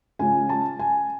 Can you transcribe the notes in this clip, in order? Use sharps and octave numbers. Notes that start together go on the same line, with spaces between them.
C#3 G#3 C#4 F4 G#5
A5
G#5